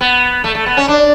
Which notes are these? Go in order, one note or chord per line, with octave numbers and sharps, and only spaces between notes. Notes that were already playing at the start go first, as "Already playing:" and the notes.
B3
A3
A3
B3
C#4
D4